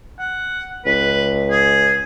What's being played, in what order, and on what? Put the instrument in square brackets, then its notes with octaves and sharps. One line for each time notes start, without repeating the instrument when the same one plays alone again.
[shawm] F#5
[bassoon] C#2 [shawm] B4
[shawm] G#4